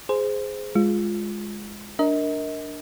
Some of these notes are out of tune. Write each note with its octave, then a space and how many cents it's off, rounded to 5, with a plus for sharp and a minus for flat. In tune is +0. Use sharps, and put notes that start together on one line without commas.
G#4 +5 C5 -15
G#3 +0 F4 +0
D4 +0 A#4 +0 D#5 +35